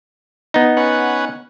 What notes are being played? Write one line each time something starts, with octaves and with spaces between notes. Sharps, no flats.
B3 D#4
C#4 B4 F#5